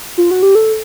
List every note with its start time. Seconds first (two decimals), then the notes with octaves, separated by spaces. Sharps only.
0.18 F4
0.31 F#4
0.43 G4
0.55 A4